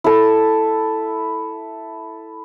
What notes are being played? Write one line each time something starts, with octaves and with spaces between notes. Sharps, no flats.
E4 A4